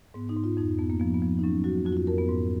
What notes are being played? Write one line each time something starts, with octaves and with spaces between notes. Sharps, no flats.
G#2 B3
D#4
G#2
F4
F2 D#4
F2 B3
A#3
F3 B3
B3
F3
D#4
F#3 C#4
F#3 F#4
F2 F#4
F4
F#4
F2 A#4
B3
G#2